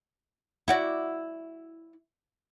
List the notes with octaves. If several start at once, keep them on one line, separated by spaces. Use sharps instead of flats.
E4 F#4 D5